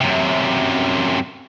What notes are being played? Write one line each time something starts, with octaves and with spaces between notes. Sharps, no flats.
F#2 C3